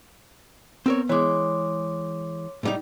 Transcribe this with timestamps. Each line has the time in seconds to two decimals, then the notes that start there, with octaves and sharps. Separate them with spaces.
0.86 B3 C4 A#4 C#5
1.09 E3 G#3 C#5 C6 D6
2.63 A2 G3 D#4